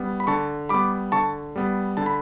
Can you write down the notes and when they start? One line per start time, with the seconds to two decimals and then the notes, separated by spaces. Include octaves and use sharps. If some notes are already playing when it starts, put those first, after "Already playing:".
Already playing: G3 B3
0.20 B5
0.27 D3 A5 C#6
0.69 G3 B3 B5 D6
1.12 D3 A5 C#6
1.56 G3 B3
1.97 D3 A5
2.06 B5